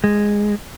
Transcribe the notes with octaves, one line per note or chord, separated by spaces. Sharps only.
G#3